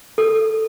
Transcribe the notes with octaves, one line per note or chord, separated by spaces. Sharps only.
A4